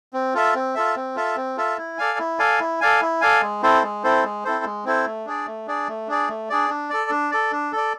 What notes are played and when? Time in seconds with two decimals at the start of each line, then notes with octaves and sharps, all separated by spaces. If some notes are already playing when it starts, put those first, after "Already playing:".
0.13 C4
0.34 F4 A4 E5
0.54 C4
0.75 F4 A4 E5
0.96 C4
1.15 F4 A4 E5
1.36 C4
1.57 F4 A4 E5
1.78 E4
1.98 A4 D5 F5 G#5
2.19 E4
2.39 A4 D5 F5 G#5
2.60 E4
2.81 A4 D5 F5 G#5
3.01 E4
3.21 A4 D5 F5 G#5
3.41 G#3
3.62 C4 E4 A4 C5
3.82 G#3
4.03 C4 E4 A4 C5
4.24 G#3
4.44 C4 E4 A4 C5
4.64 G#3
4.85 C4 E4 A4 C5
5.06 A3
5.26 D4 G#4 D5
5.46 A3
5.67 D4 G#4 D5
5.88 A3
6.08 D4 G#4 D5
6.28 A3
6.49 D4 G#4 D5
6.70 D4
6.90 A4 D5
7.11 D4
7.31 A4 D5
7.52 D4
7.72 A4 D5